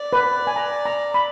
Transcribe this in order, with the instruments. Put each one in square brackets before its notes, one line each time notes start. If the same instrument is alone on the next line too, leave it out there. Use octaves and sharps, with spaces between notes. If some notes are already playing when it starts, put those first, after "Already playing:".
Already playing: [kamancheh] D5
[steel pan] B4
G#5
A#5
A#5
B5